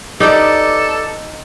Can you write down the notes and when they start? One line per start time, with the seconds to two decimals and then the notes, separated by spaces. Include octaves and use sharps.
0.20 D#4 G4 A4 B4 D5